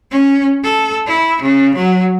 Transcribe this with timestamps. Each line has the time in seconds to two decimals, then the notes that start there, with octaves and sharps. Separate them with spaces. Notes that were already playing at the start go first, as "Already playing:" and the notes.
0.11 C#4
0.64 A4
1.07 E4
1.42 C#3
1.75 F#3